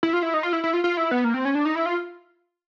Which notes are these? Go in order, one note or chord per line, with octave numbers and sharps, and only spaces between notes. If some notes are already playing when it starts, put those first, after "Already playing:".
E4
F4
E4
D#4
F4
E4
E4
F4
F4
E4
B3
A#3
C4
C#4
D4
D#4
E4
F4